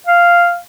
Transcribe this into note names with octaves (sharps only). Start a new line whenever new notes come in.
F5